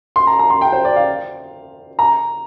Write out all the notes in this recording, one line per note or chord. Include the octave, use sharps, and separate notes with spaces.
C6
A#5
A#5
C6
G5
C5
D5
F5
A#5